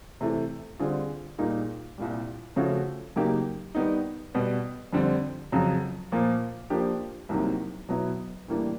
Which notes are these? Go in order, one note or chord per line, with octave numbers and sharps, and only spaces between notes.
C3 E3 A3
D3 G3 C4 F4 G#4
A#2 G3 A#3 D#4 G#4
C2 A#2 G3
C#3 F3 A3 C#4 F#4
C#3 F#3 A#3 D#4 G4
D#3 G3 B3 D#4
B2 G3 B3
F2 D3 G3 C4
F2 C#3 F#3
A#2 F3 A#3
F3 A#3 D4 G4
C2 C3 D#3 F#3 A#3
B2 F#3 B3 E4
A2 E3 G3 A#3 D4